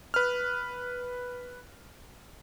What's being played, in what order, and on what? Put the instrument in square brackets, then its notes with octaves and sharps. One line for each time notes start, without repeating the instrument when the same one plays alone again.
[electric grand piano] B4 F6